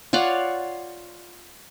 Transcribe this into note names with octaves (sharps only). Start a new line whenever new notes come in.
F4 C#5 D5 F#5